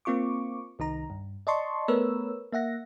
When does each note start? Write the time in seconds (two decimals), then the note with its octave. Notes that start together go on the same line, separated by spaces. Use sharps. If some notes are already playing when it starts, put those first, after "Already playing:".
0.05 A#3 C4 F4 C#6 D6
0.79 C2 D#3 D#4 A#5
1.10 G2
1.47 D5 D#5 A5 C6 C#6
1.88 A3 B3 A#4 B4 C#5 E6
2.52 A#3 E5 F#5 A#6